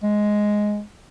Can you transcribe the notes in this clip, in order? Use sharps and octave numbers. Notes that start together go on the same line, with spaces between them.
G#3